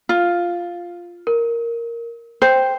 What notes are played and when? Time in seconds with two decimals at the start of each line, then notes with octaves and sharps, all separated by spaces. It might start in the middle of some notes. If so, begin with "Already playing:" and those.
0.09 F4
1.27 A#4
2.42 C5 G5